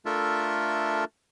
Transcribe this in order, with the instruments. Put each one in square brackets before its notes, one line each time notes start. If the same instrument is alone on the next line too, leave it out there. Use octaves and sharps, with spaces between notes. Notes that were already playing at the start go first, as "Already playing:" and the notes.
[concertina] A3 D4 F4 A4 A#4 E5